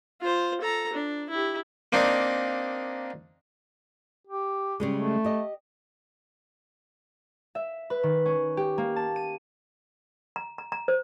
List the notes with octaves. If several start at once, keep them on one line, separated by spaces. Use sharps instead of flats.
F4 C5
A4 A#5
D4
E4 G4
A#3 C4 D4 D#4
G4
C#3 G3 G#3
A3
G4 D#5
E5
B4
D#3
C#4
G4
A#3
A5
D#7
A#5
A#5
A#5
C5